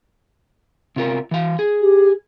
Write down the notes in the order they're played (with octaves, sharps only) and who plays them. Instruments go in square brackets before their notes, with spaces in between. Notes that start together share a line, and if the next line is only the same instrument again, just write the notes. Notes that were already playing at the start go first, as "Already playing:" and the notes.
[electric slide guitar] C3 F4 A#4
E3 F5
G#4
[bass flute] G4